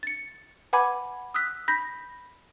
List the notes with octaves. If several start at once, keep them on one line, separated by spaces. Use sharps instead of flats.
A6 C#7
B4 F#5 G#5 B5 D6 G#6
D#6 E6 F#6 B6
B5 G6 A#6 B6